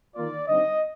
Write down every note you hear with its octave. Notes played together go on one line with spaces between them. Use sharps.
D#3 A#3 F4 D5
D3 G3 C4 D#4 D#5